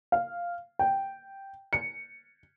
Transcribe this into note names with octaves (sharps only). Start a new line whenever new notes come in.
F5
G5
C#7